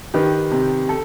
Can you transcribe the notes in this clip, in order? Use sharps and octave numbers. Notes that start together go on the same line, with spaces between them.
D#3 G4 B4
C3
A4